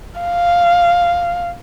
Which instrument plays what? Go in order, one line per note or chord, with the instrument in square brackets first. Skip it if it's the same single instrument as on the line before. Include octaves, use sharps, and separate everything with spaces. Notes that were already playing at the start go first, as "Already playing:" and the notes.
[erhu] F5